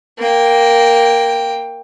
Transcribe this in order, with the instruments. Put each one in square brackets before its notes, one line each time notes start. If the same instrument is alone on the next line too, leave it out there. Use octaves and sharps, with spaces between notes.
[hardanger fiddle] A#3 G5